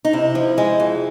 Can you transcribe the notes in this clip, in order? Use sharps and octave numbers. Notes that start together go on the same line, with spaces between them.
D#4
C3 E4
F3
G#3
F2